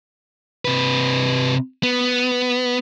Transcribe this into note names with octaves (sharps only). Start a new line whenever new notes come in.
C3 B4
B3